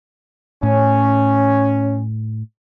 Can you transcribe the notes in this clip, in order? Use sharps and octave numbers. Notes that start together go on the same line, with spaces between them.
A2 C#4